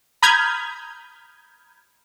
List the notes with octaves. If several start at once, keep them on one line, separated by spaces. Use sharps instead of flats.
A#5 B5 D#6 F6 G6 G#6